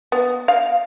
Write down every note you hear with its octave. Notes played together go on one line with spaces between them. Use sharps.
B3
F5